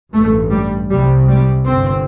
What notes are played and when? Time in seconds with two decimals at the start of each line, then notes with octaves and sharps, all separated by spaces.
0.13 A1 G2 A3
0.51 G3
0.89 C2 C3 G3
1.28 G3
1.66 G1 G2 C4